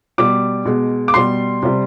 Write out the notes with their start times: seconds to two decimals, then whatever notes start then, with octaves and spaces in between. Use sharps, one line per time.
0.18 B2 G3 D6
0.65 B2 G#3
1.08 D6
1.14 B2 G3 C6
1.63 C3 G3